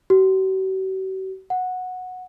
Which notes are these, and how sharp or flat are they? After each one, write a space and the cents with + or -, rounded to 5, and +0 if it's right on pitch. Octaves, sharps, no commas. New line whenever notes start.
F#4 +45
F#5 -10